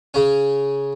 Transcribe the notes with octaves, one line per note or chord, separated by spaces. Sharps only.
C#3 C#4